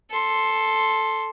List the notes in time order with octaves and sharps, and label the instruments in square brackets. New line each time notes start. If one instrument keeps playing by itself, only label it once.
[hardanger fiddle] A4 C6